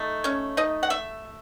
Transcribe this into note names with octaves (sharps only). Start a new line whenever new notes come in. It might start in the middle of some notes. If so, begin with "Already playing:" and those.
Already playing: A3 D#4
C#4 C#5
D#4 D#5
F#5
E5